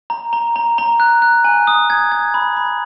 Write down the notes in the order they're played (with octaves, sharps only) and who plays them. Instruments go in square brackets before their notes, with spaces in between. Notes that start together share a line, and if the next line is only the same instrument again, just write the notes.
[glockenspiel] A#5
A#5
A#5
A#5
F#6
F#6
G#5
D#6
G#6
G#6
B5
B5